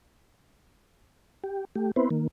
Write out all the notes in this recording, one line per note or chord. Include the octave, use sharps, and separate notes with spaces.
G4
A3 G4
B3 C4 E4 B4 C5
D#3 A#3